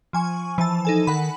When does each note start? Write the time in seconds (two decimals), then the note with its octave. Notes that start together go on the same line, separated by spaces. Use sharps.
0.13 F3 G#5 C#6
0.58 E3 F3 A5
0.85 D#4 A4 G#5
1.07 D#3 F#5 B5